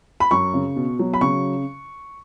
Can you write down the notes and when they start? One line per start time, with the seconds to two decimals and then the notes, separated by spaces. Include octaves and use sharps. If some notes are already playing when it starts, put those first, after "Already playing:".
0.20 B5
0.31 F#2 C#6
0.54 C#3
0.76 B2
0.99 F#3
1.14 B5
1.21 C#3 C#6